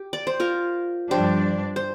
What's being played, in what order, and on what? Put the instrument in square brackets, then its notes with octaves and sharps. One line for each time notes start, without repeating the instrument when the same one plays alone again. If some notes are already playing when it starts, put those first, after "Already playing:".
Already playing: [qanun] G4
D5
C5
F4 A#4
[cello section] G2 F3 D4 [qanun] G4 C5
[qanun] C5